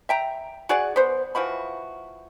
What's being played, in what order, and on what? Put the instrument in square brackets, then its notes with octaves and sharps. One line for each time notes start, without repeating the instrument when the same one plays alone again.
[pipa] E5 G5 A#5
F#4 G#4 D5 F#5
B3 C5
E3 F3 F#4 B5